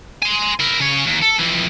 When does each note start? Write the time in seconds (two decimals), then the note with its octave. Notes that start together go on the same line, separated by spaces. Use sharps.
0.23 G#5 C6
0.60 E4 A#4
0.81 C#3 C#5
1.07 D#2
1.22 A4
1.40 F2 E3